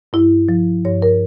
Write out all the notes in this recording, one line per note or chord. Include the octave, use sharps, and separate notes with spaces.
G2 E4
F3
G2 C#5
A#4